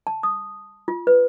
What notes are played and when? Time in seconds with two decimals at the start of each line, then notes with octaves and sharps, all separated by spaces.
0.07 A5
0.23 D#6
0.88 F4
1.07 B4